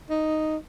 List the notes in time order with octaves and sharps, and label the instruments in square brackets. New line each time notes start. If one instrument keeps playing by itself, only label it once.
[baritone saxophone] D#4